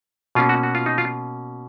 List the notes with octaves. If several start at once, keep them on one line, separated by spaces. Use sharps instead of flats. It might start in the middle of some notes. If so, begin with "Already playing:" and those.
B2 A#3 C#4 F4
F#4
F#4
F4
D#4
F4